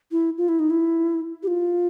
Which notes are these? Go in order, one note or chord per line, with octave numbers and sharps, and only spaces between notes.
E4
F4
E4
D#4
E4
G4
F4